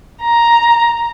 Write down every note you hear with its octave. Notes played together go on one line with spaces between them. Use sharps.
A#5